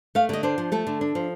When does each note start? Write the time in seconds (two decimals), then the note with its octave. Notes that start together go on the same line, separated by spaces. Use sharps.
0.15 A3 F5
0.29 D3 D#5
0.43 D4 C5
0.58 F3
0.72 A3 A4
0.87 D3
1.01 D4
1.15 F3